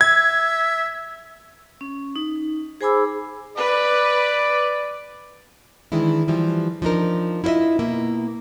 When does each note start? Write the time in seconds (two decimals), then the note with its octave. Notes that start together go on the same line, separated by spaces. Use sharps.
0.01 E5 G#6
1.81 C#4
2.16 D#4
2.81 G#4 C5 G#5 B5 D6 E6
3.58 B4 D5
5.92 D#3 E3 G#3 D4 E4
6.28 E3 F3 G3
6.82 F3 D4 D#4 A#4
7.44 E4 F4 C5 D#5 E5
7.79 B2 A#3 E4